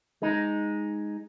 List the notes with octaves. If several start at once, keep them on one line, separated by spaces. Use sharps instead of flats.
G#3 D#4